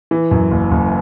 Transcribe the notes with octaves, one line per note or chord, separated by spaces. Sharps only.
E3
F#2
F#1
F#1